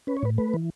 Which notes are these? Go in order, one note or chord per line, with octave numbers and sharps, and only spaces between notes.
C#4 B4
C#5
A2 B4
A3 B4
E3